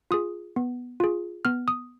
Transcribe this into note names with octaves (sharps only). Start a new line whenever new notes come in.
F4 G#4 D#6
B3
F4 G#4
B3 F6
D#6